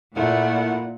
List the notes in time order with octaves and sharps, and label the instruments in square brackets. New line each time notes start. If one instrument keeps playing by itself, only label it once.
[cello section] A#2 [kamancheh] A3 F#5 [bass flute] E4